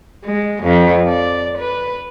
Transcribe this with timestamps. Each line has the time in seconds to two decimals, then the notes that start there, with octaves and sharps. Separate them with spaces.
0.25 G#3
0.63 F2
1.08 D5
1.58 B4